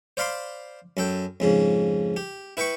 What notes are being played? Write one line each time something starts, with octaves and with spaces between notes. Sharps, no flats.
C5 D5 F5 B5 C6 D6
F#2 A4 G5
F2 G#2 C#3
G4
E4 B4 G5 B5 C#6